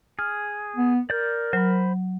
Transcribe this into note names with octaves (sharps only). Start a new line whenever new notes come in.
G#4 F6
B3
A#4 D5 G6
F#3 C5 B5